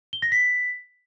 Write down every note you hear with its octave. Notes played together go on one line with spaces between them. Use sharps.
G7
A#6
B6